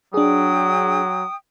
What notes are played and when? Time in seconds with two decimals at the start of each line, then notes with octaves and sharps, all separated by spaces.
0.14 F#3 D4 G#4 G5 D#6